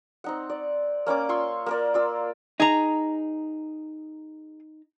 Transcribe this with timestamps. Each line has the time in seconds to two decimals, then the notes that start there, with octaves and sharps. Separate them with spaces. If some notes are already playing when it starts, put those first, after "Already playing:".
0.24 C4 D#4 F#5
0.50 D5
1.06 A#3 C#4 D5 D6
1.29 F4 C6 C#6 E6
1.66 A#3 A#4 D5
1.94 F4 D5 E6
2.60 D#4 G#4 A#5